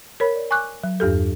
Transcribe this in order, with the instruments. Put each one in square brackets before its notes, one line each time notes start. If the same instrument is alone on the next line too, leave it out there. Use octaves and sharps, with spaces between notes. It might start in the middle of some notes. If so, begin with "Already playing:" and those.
[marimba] A#4 C#5 B5
D5
G#5 C#6 D6 F#6
F#3
E2 G2 G4 A4